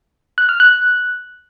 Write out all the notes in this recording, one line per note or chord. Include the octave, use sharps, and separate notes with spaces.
F#6
F6
F#6